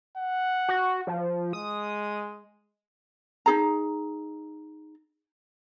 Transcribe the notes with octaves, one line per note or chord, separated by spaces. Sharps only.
F#5
F#4
F3
G#3 D#6
D#4 G#4 A#5